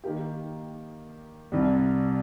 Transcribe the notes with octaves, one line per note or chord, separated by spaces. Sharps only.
D#3 A#3 G4
C2 C3 G3